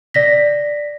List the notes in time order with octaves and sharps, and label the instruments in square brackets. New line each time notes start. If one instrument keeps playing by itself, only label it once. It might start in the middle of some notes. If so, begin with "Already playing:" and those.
[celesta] D5 A#6 B6